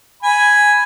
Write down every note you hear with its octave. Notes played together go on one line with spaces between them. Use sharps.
G#5 B5